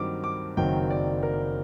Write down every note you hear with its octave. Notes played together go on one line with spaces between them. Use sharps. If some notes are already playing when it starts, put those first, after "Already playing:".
Already playing: G2 D#3 F#3 C4 D6
D6
F#1 F#2 D#3 F#3 C4 G5
D5
A#4